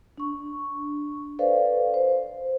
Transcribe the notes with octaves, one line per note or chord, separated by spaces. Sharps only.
D4 C#6
A4 B4 C5 D5 F5
C5